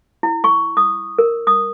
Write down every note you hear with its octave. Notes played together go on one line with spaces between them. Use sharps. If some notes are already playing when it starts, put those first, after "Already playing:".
E4
C#6
D#6
A#4
D#6